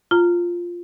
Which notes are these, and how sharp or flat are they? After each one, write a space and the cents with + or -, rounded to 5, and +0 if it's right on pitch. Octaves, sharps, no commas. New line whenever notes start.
F4 +0 A#5 -20